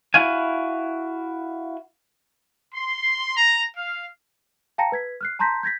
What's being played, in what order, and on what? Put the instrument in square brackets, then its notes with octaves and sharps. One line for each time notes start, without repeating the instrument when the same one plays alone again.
[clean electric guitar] E4 F#4 F5 G#5
[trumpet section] C6
A#5
F5
[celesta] F5 G5 A5 A#5 A#6 C#7
B4 G#6 B6
F6 F#6 C7
A5 A#5 C6 G6 A#6 B6
G6 G#6 A#6 B6